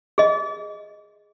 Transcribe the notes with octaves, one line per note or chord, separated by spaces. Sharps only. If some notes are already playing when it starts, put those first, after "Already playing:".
G#4 D#5